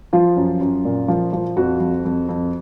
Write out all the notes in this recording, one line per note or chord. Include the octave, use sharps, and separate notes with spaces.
F3 F4
F#2
F#2
A#2
F3
F3
F2 F#4
F2
F2
F2